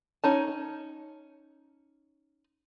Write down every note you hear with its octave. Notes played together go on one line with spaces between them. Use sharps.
C#4 D#4 A5